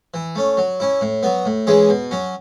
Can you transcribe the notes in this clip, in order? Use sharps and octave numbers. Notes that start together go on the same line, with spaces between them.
E3
A3 C#4
F#3
C#4 E4
A2
F#3 B3
A2
E3 G#3 C#4 G#4
B2
F#3 C#4